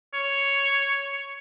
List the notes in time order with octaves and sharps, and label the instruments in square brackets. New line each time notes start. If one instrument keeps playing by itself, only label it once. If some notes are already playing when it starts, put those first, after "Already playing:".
[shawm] C#5